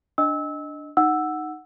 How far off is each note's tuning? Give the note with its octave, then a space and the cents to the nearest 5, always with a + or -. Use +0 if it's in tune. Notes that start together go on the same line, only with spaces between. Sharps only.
D4 +0 D#5 +0 E6 -25
D#4 -10 F#5 +0 E6 +0